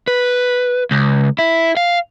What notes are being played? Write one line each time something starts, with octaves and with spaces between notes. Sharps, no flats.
B4
C#2
E4
F5